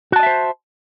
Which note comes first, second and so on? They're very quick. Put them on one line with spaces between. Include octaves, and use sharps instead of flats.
F#4 A5 D#5 E5 C5